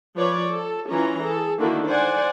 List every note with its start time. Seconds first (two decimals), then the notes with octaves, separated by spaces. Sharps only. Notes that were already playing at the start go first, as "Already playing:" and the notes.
0.17 F3 B4 C#5 D5
0.51 A4
0.90 E3 C#4 F4 A#5
1.21 G#4 A4
1.59 D3 D#3 A#3 E4 F#4 A4
1.88 C5 D5 F#5 G#5